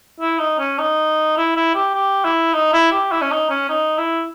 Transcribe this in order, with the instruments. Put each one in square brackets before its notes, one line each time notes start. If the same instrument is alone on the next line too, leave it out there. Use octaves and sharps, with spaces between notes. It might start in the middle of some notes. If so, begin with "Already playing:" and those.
[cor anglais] E4
D#4
C#4
D#4
E4
E4
G4
G4
E4
D#4
E4
G4
E4
C#4
D#4
C#4
D#4
E4